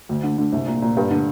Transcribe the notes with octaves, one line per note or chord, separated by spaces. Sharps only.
D2
D3
D3
C2
A#2
A#2
G2
D3